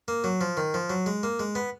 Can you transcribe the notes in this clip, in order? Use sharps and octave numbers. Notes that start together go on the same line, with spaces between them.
A#3
F#3
F3
D#3
F3
F#3
G#3
A#3
G#3
B3